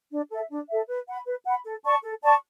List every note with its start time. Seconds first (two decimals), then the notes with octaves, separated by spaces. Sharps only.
0.10 D4
0.29 A4 E5
0.48 D4
0.68 A4 E5
0.87 B4
1.06 F#5 B5
1.26 B4
1.45 F#5 B5
1.64 A4
1.83 D5 A5 C#6
2.02 A4
2.22 D5 A5 C#6